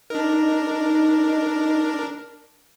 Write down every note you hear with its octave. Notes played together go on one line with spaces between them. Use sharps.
D4 D#4 A#4